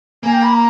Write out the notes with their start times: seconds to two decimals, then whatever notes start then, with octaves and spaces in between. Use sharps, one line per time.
0.23 A#3 G#5
0.32 G5
0.42 B5
0.53 A#5